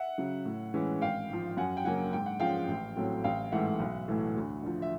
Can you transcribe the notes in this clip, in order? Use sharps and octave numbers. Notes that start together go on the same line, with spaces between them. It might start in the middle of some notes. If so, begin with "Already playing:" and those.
Already playing: E5 F#5
C#3 F#3
A2
E3 G#3 C#4
G#1 F5 G5
G#2 F3
F#2 F#5 G#5
G5
C#3 F#3 A#3 F#5 G#5
G#2 G5
F#5
F3 G#3 C#4 F5 G5
A1
A2 F#3 A3 C4
A1 F5 G5
G#2 E3 A3 E5 F#5
B1
A2 E3 A3
D2
D3 F3
E5